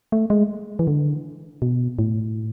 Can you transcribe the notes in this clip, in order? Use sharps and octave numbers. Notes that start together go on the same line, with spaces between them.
A3
G#3
E3
D3
B2
A2